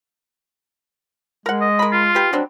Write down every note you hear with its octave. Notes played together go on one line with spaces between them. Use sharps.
G#3 A#4 F#5
D#5
A#4 B5
F4
G4 B4
F#3 G3 C4 D4